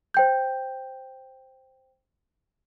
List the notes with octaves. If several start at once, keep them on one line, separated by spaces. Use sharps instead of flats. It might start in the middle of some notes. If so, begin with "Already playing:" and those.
C5 G5 G6